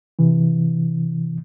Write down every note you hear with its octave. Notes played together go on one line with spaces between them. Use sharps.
C3 E3